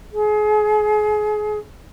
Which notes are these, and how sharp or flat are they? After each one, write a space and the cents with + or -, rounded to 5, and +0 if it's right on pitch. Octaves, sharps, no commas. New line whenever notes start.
G#4 +30